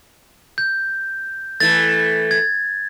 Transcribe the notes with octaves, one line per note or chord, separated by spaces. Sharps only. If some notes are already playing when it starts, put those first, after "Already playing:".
G6
E3 A3 A6
G#6